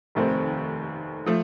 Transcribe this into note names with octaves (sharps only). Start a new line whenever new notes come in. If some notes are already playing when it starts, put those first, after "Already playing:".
F1 D#2 D#3 A3 C4
F3 A3